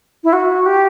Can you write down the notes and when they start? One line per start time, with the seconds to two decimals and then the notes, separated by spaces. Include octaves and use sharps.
0.23 E4
0.32 F#4
0.65 G4